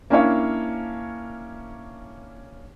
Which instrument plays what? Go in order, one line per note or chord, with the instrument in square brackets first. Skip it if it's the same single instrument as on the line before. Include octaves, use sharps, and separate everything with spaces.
[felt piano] A#3 C#4 D4 E4 C#5 F5